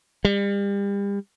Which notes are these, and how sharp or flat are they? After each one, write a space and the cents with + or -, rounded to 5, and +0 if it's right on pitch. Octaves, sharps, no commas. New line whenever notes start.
G3 +35